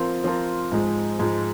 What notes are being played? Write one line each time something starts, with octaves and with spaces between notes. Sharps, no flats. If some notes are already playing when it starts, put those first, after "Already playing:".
Already playing: F3 C4 F4 A#4
F3 C4 F4 A#4
G#2 F3 G#3
G#2 F3 G#3